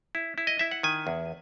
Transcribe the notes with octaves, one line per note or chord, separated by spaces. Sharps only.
E4
E4
D#5
E4 E5
F#5
D#3 G#5
E2